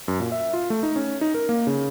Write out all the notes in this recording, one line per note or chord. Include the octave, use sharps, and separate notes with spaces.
F#2
A#2
E5
F4
A3
D#4
C#4
D#4
A#4
A#3
C#3